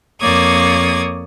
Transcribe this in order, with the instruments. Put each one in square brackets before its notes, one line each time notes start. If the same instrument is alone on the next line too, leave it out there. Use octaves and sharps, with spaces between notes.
[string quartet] F2 A#3 C#5 D5 D#6 G#6